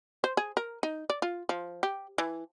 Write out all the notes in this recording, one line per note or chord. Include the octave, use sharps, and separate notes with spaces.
C5
G#4
A#4
D#4
D5
F4
F3
G4
E3